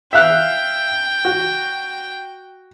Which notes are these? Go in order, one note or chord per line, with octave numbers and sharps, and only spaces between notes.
E5 F5 G5 F#6
F#4